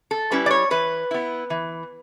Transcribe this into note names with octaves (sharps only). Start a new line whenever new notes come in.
A4
G3 C#4 E4 B4
D5
C#5
E3 B4
B3 E4
E3